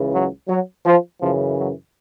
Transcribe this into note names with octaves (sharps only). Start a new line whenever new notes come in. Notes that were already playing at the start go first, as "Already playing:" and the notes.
Already playing: C#2 C#3 E3
F#3
F#3
F3
F#2 C#3 E3 F3
F#3